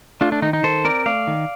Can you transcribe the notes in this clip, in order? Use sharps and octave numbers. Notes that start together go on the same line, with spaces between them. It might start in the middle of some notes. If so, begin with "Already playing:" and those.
A3 D4 F4
D4
D#3 D#4
D#4
D#3 A4 C5
C4 A#4 D5
A3 D5 F5
D#3